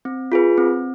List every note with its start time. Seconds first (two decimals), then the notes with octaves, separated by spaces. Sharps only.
0.05 C4
0.32 F4 G#4 B4
0.58 C4